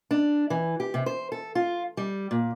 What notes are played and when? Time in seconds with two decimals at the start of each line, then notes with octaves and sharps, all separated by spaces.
0.11 D4
0.50 E3
0.80 G4
0.94 C3
1.06 C5
1.32 A4
1.55 F4
1.97 G3
2.31 A#2